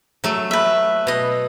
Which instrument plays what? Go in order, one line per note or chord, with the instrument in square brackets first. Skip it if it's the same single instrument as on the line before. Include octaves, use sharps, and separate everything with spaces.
[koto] F#3 A3
[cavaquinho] B4 E5
[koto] B2 D#5